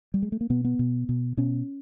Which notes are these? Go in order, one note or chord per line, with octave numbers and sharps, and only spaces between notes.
G3
G#3
A3
A#3
B2 B3
B3
B2
B2
B2 C#4